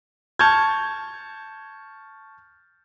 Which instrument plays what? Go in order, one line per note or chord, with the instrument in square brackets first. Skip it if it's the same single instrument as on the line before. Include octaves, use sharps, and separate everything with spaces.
[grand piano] A5 C#6 F6 G6 G#6